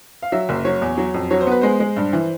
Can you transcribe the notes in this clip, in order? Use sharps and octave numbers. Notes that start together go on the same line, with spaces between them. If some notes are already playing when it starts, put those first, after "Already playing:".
F5
F#3 E5
F#1
F#3 C#5
E2
F#3
F2
F#3 C#5
C5
B3 B4
G#3 C5
G#3
G2
E3